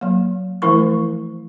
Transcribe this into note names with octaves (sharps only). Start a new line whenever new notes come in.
F#3 A#3
E3 F3 A3 E4 A#4 C#6